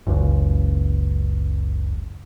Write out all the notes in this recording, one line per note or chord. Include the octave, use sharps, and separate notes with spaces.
F#1 C#2